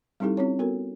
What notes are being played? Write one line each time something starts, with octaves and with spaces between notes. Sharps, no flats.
G3 C4 D#4 E4 G4 A4
C4 C#4 E4 F4 C#5
B3 F#4 A4 A#4